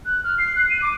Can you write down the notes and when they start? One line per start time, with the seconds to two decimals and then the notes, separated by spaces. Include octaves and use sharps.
0.06 F#6
0.24 F6
0.38 C7
0.56 F#6
0.70 D#7
0.82 D6